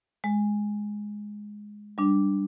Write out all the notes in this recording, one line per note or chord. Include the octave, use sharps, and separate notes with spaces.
G#3
G3 D4